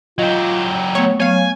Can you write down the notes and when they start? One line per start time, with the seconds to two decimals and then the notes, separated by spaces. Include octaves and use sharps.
0.18 F#3 F4 G4 D#5
0.95 A3 B3 C#5
1.20 F#3 B3 C#5 F5 G#5